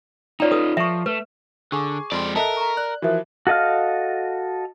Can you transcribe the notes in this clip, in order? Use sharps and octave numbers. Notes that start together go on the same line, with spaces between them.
D#4 F4 C#5 D5 A#5
A4 B4 D#6
F3 E5 C#6
A3 B4
D3 G#4 G#5 C#6 D6
F2 G#3 D5 C6
A4 A#4 D#5 E5 A5 F#6
A#5 C#6
D5 F#6
E3 F3 F#4 A#4 E5
F#4 A4 D#5 F5 F6